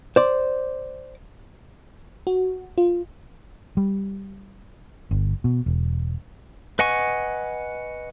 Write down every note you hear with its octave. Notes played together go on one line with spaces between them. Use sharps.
C5 D5
F#4
F4
G3
G1
B2
E1
B4 D#5 F#5 G#5 C#6